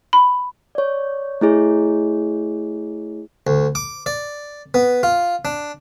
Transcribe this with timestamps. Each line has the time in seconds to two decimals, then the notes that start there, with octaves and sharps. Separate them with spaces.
0.13 B5
0.75 C#5 D5
1.41 A3 E4 G#4 C#5
3.47 D2
3.75 D6
4.06 D5
4.74 B3
5.03 F4
5.45 D4